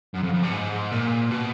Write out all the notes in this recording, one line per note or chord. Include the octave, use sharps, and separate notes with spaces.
F#2
F2
F2
G2
G#2
A#2
B2